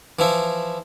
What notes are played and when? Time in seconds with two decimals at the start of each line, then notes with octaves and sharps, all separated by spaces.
0.19 E3 F3 E4